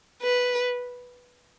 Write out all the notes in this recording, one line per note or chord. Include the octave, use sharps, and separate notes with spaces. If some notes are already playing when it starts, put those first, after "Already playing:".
B4